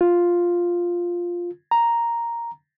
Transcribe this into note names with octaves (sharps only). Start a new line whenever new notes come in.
F4
A#5